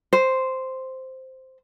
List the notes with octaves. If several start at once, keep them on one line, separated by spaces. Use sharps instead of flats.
C5